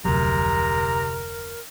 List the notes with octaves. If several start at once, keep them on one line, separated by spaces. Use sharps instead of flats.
F1 D2 C3 F#3 A#4 A#5